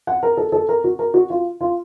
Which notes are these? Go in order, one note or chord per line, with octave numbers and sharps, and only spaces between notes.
F#5
A#4
A4
A4
A#4
F#4
A#4
F#4
F4
F4